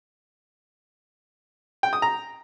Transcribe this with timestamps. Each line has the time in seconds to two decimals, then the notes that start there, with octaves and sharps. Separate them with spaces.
1.83 G5
1.93 D#6
2.02 A#5